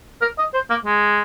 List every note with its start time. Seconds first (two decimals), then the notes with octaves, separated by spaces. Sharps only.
0.21 A#4
0.38 D#5
0.54 C5
0.70 A#3
0.86 G#3